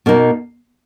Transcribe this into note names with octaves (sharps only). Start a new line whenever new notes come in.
B2 A#3 D#4